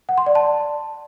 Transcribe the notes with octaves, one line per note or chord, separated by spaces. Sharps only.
F#5
C6
D5
A5